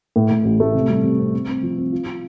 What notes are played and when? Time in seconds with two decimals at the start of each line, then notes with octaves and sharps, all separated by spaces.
0.16 A2
0.31 A2
0.45 A1
0.60 A3
0.74 C3
0.90 G3
1.04 C3
1.19 C4
1.33 C4
1.48 C4
1.63 F3
1.78 C4
1.93 F4
2.06 F4